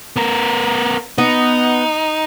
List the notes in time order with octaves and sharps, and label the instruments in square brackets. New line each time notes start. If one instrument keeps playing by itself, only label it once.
[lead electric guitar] B3 A#4
[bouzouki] B3 [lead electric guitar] D#4